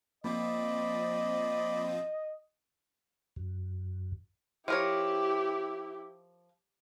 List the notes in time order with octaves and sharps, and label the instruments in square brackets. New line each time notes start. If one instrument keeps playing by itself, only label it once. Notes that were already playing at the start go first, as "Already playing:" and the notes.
[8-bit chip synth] F3 C4 F4 [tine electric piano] A#3 [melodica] D5 B5 [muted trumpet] D#5
[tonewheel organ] F#2
[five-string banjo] F3 A#4 C#5 [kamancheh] E4 G4